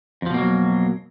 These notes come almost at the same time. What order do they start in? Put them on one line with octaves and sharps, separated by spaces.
F2 F3 B2 A#3 F#3